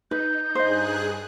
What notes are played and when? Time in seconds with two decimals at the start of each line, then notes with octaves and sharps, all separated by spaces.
0.11 D#4 B4 G6
0.55 G2 G#4 C5 D#5 F#6